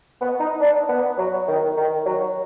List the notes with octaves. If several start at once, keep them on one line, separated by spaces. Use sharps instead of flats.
B3
D#4
D4
B3
F#3
D#3
D#3
F#3